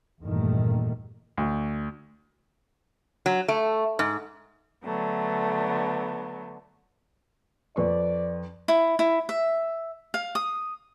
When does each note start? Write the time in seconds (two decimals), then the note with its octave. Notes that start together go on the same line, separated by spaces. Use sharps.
0.22 E2 G2 A#2 D#3 A3
1.37 D2
3.26 F#3
3.48 A3
3.99 G#2
4.84 D3 F#3 A3 B3
7.76 F2 B4 D5 C#6
8.68 E4
8.99 E4
9.29 E5
10.14 F5
10.35 D#6